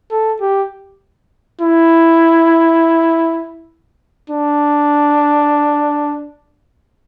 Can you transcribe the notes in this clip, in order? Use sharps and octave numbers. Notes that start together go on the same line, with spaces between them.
A4
G4
E4
D4